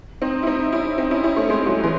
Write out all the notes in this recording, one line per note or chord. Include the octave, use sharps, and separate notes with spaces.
C4 D#4
E4
C4 D#4
C#4 E4
C4 D#4
C#4 E4
C#4 E4
A3 C#4
G#3 C4
F#3 A3
E3 G#3